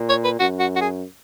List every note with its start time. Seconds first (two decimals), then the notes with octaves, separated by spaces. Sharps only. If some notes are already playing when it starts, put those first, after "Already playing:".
Already playing: A#2
0.09 C#5
0.24 B4
0.40 F#2 F#4
0.60 F#4
0.76 F#4
0.81 G#4